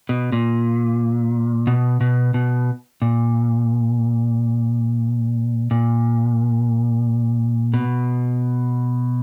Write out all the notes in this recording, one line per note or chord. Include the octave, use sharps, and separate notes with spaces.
B2
A#2
B2
B2
B2
A#2
A#2
B2